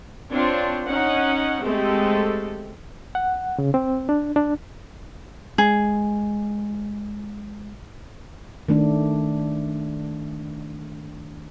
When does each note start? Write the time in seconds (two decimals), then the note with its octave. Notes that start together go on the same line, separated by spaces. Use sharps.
0.30 C4 D4 F4 C#5
0.87 C#4 D#4 F#5
1.62 G#3 A3 C4 G4 A4
3.15 F#5
3.58 C#3
3.74 C4
4.09 D4
4.36 D4
5.58 G#3 G#4
8.68 D#3 A3 D4